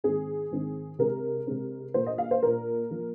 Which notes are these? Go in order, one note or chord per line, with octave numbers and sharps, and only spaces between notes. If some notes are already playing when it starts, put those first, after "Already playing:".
G#2 D#3 C4 G#4
G#2 D#3 C4
C3 G#3 C4 A#4
C3 G#3 C4
A#2 A#3 C5
D#5
F5
C5
A#2 A#3 A#4
F3 A#3